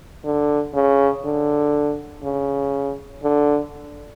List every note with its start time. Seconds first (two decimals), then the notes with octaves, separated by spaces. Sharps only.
0.24 D3
0.74 C#3
1.24 D3
2.23 C#3
3.23 D3